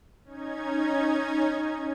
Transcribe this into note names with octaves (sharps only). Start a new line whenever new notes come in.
C#4 D#4 G#6